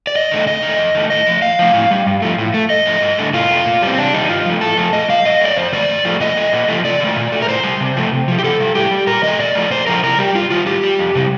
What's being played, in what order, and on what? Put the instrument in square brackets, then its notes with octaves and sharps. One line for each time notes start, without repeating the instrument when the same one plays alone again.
[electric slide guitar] D5
G2 D#5
D#3 A3
C3 D#5
D#3 A3
F2
D#3 A3
A2 D#5
F3 A3
A2 F5
F3 A3
A2
G3
G2
F3 A3
A2
A3
F2 D#5
D3 F3 A3
G2
D3 A3
A2 F4
A3
A#2
G3 C4
C3 D4
D#3 G3 D#4
G2 F4
F3 A3
A2 A4
F3 A3
A#2 D#5
G3 F5
A#2 D#5
A3 D5
F2 C5
D#3 A3 D5
G2
F3 A3
A#2 D#5
A3
A#2
F3 A3
C3 D5
D#3 A3
A#2
A3
A#4
A2 C5
G3
C3
F3 A3
C3
F3 A3
G4
C3 A4
G3
A2 G4
G3
A#2 A#4
F3 A3 D#5
A#2 D5
F3 A3
A#2 C5
F3 A3 A#4
C3 A#4
G3 G4
G2 F4
D#3 G3 F4
A2 G4
G3
F2
C3 G3